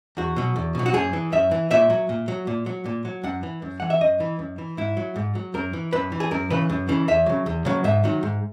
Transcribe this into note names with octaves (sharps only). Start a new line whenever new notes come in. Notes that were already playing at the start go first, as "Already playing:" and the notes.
E2 F#4
B2 F#3
E2
B2 F#3
F#4
F#2 G#4
E3
F#2 E5
E3
A#2 E5
F#3
A#2
F#3
A#2
F#3
A#2
F#3
F#2 F#5
E3
F#2
E3 F#5
E5
F#2 D#5
E3
F#2
E3
G#2 E4
F#3
G#2
F#3
F#2 A#4
E3
F#2 B4
E3
G#4
F#2 A#4
C#3 E3 B4
F#2
C#3 E3
E2 E5
C#3 F#3
E2
C#3 F#3
G#2 E5
D#3 F#3
G#2